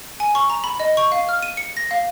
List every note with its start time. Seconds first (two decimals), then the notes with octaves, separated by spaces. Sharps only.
0.20 G#5
0.35 C#6
0.50 A#5
0.64 B5
0.80 D#5
0.97 C#6
1.12 F5
1.29 F6
1.43 D#7
1.57 C#7
1.77 A#6
1.91 F5